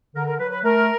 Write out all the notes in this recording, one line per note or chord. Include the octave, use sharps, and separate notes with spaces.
D3 A#4
A#4
F#3 B4
B4
A3 A#4